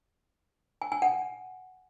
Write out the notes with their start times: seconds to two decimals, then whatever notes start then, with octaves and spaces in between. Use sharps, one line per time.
0.82 G#5
0.92 G#5
1.02 F#5